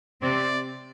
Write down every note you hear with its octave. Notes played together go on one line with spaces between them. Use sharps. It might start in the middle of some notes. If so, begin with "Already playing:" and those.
C3 C4 D5